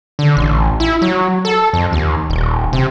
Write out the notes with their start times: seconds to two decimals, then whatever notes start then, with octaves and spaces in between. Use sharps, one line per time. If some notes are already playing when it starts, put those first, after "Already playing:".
0.19 D3
0.37 A1
0.80 E4
1.02 F#3
1.45 A4
1.73 F2
1.92 D#2
2.30 D#1
2.73 C3